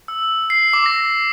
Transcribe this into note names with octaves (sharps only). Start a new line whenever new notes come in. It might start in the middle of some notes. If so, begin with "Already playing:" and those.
E6
C7
D6
A#6